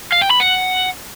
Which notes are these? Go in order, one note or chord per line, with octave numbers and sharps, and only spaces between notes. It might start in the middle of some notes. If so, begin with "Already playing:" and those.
F5
G5
B5
F#5